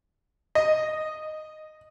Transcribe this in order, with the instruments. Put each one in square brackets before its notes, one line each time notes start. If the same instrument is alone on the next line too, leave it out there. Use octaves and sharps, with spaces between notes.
[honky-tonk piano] D#5